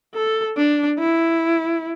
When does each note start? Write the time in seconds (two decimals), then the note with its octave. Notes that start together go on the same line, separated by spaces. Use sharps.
0.15 A4
0.57 D4
0.99 E4